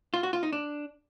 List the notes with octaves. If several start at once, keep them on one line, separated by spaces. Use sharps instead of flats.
F4
F#4
F4
D#4
D4